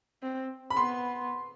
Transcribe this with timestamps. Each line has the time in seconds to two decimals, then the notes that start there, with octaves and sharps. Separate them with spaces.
0.23 C4
0.70 B5
0.77 B3 C6